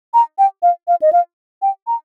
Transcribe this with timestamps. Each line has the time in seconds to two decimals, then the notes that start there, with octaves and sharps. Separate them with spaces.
0.14 A#5
0.39 G5
0.63 F5
0.88 F5
1.02 D#5
1.13 F5
1.62 G5
1.87 A#5